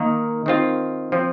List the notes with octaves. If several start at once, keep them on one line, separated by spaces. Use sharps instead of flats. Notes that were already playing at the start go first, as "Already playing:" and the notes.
Already playing: D#3 A#3 D#4
D#3 C4 F4
F3 C4 F4